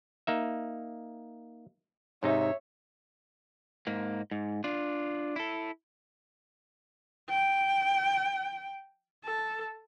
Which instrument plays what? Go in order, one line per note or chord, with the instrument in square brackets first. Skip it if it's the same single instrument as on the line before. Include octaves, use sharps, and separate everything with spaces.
[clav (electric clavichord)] A#3 D#4 E5
[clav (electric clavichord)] G#2 C3 D#4 [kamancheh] C#5 E5
[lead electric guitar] G#2 A#3
G#2
D4 F4
E4 A4
[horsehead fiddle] G5
A4